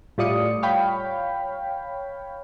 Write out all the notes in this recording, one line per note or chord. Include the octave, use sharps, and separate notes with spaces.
A2 G3 F4 D5 D#6 C#7
C#5 F5 G5 B5